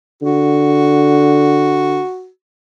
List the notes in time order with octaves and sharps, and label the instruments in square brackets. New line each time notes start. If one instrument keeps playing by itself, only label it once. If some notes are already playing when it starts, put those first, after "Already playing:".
[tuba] D3 [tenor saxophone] F#4